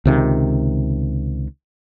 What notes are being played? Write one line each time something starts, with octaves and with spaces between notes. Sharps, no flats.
C#2 C3 D#3